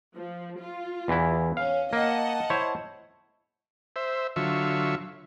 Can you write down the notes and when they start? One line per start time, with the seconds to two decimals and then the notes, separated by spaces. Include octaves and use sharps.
0.14 F3
0.58 F4
1.08 E2 E3 E4
1.57 C#4 F5
1.93 A#3 D#5 F#5 A5
2.50 E4 C5 C#5
3.96 C5 E5
4.36 D3 F#3 F4 E5 C#6